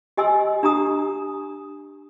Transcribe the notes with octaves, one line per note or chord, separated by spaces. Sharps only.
G4 D#5 G#5 C6 E6
D4 G4 A#5 D#6